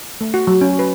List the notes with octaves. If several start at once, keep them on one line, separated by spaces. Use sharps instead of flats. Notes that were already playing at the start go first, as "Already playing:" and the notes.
A3
F#4
F#3
C#4
B4